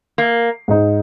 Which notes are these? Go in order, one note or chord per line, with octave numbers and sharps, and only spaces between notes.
A#3
G#2 G#3 D#4